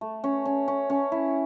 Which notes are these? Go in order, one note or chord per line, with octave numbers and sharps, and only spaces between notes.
A3
C#4
C#4
C#4
C#4
E4